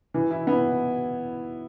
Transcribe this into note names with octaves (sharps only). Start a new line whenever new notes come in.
E3
E4
B3